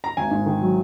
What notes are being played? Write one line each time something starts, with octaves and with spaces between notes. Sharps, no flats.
A#5
G#1 G#5
G#2
D#3
F#3